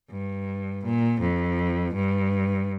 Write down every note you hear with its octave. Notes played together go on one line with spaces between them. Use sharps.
G2
A#2
F2
G2